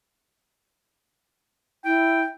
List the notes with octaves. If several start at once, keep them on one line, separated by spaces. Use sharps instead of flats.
E4 G5